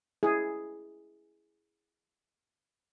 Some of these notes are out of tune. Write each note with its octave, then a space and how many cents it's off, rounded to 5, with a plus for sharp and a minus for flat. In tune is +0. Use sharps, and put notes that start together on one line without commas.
E4 +0 G#4 +0